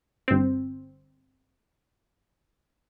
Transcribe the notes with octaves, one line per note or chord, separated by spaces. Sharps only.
G1 C4